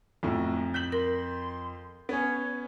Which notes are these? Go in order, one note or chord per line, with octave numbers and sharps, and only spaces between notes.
B1 F2 A2
G6 B6 F#7
A#4 C6
B3 C#4 C#5